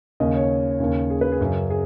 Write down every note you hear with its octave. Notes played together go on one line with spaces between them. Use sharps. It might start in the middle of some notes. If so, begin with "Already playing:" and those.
D#2 C#3 D#5
C#5
D#2 C#3
G#4
B4
G#4
F#2 C#3
G#4